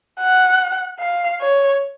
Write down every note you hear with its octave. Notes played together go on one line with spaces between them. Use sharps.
F#5
F5
C#5